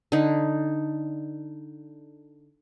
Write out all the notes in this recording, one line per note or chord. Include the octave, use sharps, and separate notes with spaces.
D3 D#4